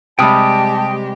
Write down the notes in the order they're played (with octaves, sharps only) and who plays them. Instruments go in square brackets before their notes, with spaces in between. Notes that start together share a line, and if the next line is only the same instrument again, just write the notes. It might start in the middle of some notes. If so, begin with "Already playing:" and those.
[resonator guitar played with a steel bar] C3 G3 [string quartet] G#3 G4 [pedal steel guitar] G5 D#6 [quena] A5